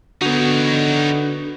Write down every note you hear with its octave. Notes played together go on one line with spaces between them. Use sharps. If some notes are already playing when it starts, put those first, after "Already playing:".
D3 B3 D#4 F#4 C#5